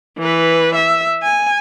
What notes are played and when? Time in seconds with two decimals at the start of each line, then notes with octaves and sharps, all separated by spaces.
0.19 E3 B4
0.75 E5
1.23 G#5